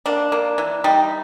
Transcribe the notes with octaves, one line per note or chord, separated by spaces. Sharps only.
A#3 D4
A#3
E3
G3 D#4